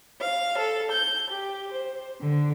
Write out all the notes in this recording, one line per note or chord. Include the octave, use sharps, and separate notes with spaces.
F5
A4
G6
G4
C5
D3